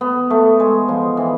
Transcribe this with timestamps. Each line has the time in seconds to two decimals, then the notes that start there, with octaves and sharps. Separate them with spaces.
0.01 B3
0.30 A3
0.60 G#3
0.88 F3
1.17 E3